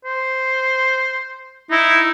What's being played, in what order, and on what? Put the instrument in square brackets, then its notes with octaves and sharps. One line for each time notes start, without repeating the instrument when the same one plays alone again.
[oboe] C5
[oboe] D#4 [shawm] E4